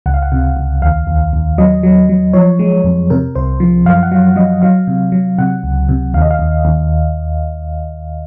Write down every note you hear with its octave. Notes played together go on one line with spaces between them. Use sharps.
C#2 F#5
F5
F#5
C3
C#2
D#2 F5
D#2
D#2
F#3 D#5
F#3
F#3
F3 C#5
G#3
F2
C3 A#4
C2 C5
F3
F#2 F5
F#5
F#3 F5
F#3 D#5
F#3 F5
C3
F#3
C3 F#5
C#2
C3
D#2 F5
D#5
F5
D#2
D#2